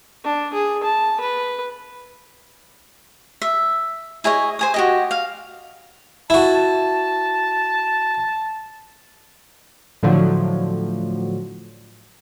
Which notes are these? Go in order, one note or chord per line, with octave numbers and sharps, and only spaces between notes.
D4
G#4
A5
B4
E5
E4 G#4 C#5 D#5
C5 G#5 D#6
F#4 G4 D#5
F5
E4 F#4 A5
A2 D3 F3 F#3